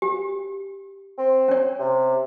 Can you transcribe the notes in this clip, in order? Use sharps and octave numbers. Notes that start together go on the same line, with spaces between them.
G4
C4
C#4 C#5
C3